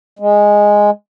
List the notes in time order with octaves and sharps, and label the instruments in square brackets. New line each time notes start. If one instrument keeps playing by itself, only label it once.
[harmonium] G#3